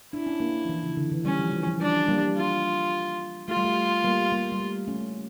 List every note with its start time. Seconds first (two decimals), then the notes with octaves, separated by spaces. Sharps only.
0.13 D4 E4
0.26 C#4
0.40 A#3 D4
0.65 F3
0.69 E3
0.83 C#3
0.97 D3
1.11 E3
1.25 G3 C#4
1.39 F3
1.53 E3
1.67 F3
1.81 G3 D4
2.09 G3 A#3
2.37 F4
3.48 A3 F4
3.57 G3
3.64 A3
4.04 G3 A#3
4.32 G3 A#3
4.52 G3
4.60 A3
4.88 A3 C#4